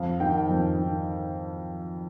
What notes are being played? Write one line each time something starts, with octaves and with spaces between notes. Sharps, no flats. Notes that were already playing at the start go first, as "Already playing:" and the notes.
Already playing: F2 F5
D#3 G5
F2
D#3